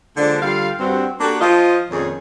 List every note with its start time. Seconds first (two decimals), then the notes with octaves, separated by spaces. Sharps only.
0.17 D3 F3 G#3 A#3 D4
0.41 D3 G3 F4 F5
0.79 G2 C4 F#4
1.21 A#3 D4 F#4 G4 A4
1.41 F3 F4 D#5
1.91 F2 A#2 D#3 C#4 G#4 C#5